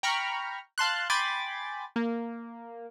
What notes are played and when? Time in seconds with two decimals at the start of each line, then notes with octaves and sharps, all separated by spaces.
0.03 G5 A#5 B5 C#6 F6
0.78 F5 A5 C6 F#6
1.10 G5 G#5 B5 C6 D6 A6
1.96 A#3